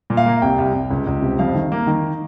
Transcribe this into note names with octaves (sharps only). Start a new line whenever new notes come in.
A#2
F5
A#3
C2 G5
C2
C2
C#2
C#2
C3
F2 F5
D#3
A#3
D#3